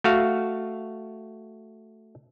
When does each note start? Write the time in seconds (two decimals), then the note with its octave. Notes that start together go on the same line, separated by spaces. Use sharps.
0.04 A3 F#4 F5